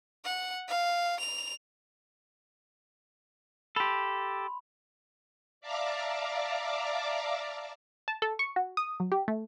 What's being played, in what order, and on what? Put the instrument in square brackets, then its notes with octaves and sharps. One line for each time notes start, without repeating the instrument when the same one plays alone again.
[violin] F#5
F5
F7
[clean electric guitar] G4 A4 [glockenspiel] B5 C6
[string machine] D5 E5 F5 A5 A#5 D6
[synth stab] A5
A4
C#6
F#4
D#6
F#3
G4
A3